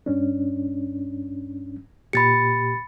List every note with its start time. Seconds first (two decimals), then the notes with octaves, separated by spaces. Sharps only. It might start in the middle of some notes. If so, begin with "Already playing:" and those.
0.06 G2 C#4 D4
2.13 A#2 G4 B5 A6 C#7